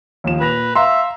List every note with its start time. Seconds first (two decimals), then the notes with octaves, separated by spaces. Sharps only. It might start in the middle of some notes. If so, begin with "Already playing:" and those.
0.24 D#2 F3 E7
0.40 A#2 B4 A#6 F7
0.75 E5 F5 A#5 C6